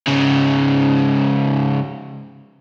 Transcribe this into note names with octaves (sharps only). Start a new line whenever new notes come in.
G#2 C#3